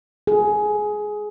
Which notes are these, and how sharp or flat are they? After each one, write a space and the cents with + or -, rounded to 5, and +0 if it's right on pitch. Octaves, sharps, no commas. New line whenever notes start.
G#4 +15